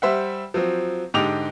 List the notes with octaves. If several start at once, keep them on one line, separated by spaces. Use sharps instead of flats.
G3 C5 E5 F#5
F3 F#3 C4
G#2 D3 G4 D#5 D6 F7